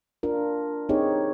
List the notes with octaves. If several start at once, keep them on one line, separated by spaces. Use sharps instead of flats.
D4 F4 A#4
C4 D#4 G4 G#4 C#5